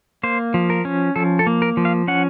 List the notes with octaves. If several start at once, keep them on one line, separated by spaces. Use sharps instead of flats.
A#3 C5
F3
A#4
C#4
F3 A4
A4
A#3
A#4
F3
F5
C#4 F#5